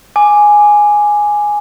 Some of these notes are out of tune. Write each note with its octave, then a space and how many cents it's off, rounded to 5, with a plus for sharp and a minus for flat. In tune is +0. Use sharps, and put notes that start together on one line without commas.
G#5 +0 D6 +5